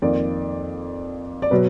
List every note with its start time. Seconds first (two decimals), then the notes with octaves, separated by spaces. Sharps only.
0.02 F2 D#3 A#3 D5
1.42 D5
1.51 B2 F#3 B4